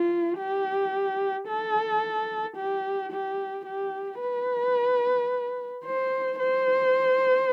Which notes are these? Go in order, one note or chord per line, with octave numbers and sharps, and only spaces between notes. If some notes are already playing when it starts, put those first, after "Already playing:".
Already playing: F4
G4
A4
G4
G4
G4
B4
C5
C5